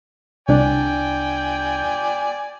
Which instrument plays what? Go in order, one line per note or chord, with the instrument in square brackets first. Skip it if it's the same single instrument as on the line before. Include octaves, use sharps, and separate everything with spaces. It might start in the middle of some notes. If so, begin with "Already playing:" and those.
[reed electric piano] C2 D4 [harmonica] D5 G5 G#5